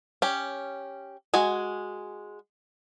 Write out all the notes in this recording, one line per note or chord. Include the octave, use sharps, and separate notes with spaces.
C#4 G4
G#3 F#4 G#5